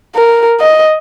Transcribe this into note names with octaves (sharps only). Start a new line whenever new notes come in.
A#4
D#5